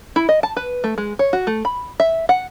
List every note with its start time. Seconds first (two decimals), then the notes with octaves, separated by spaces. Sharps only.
0.16 E4
0.29 D#5
0.43 A5
0.57 B4
0.84 A3
0.98 G#3
1.19 C#5
1.33 F#4
1.47 A3
1.65 B5
2.00 E5
2.29 F#5